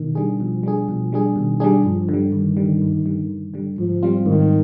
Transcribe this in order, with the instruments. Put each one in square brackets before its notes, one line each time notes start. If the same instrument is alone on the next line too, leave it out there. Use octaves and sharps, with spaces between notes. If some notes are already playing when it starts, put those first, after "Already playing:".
Already playing: [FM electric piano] B2 [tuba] D#3
[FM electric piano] G3 D4 G#4
[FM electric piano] B2 [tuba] F3
[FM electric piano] G3 D4 G#4
[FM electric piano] B2 [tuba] F3
[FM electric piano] G3 D4 G#4
[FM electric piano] B2 [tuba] D#3
[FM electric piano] G3 D4 G#4
[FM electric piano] G2 [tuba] F3
[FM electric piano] D3 G3
[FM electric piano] G2 [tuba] D#3
[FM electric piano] D3 G3
G2
D3 G3
G2
D3 G3
[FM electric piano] G#2 [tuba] F3
[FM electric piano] G3 C4 F4
[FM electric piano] G#2 [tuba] D#3